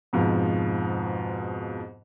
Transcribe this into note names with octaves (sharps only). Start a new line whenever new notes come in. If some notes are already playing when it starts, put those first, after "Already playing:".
F2 G#2 B2 F3